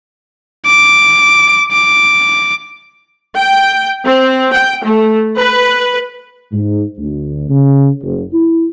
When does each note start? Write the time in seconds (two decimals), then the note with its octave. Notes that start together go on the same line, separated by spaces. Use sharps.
0.66 D6
1.72 D6
3.36 G5
4.06 C4
4.53 G5
4.84 A3
5.38 B4
6.53 G#2
6.98 D2
7.50 C#3
8.03 F#1
8.33 E4